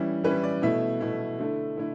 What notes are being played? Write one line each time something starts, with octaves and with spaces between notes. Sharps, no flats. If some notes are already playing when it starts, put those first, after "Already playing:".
Already playing: E3 G3 C#4 E4
E3 G3 C#4 E4 B4
D5
B2 A3 E4 E5
B2 A3 E4
D3 A3 E4
D3 A3 E4